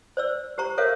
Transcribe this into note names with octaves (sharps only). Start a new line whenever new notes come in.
C5 D5 E6
G4 C5 A#5 C#6
A4 A#4 C5 C#5 E5 F5